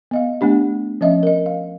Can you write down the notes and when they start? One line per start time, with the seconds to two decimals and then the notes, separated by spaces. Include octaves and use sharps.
0.11 B3 D#5 F5
0.41 A3 B3 D4 G4
1.01 F3 C#4 D#5 E5
1.23 A#4 D#5
1.46 F5